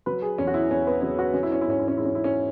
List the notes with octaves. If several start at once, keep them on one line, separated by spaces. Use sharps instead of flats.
F#3 B4
G#4
E2 C#4
F#4
E4
E2 C#4
B3
F#3 C#4
F#4
F#3 C#4
E4
C#4
E4
G#2 C#4
E4
C#4
G#2 E4
C#4
E4
C#4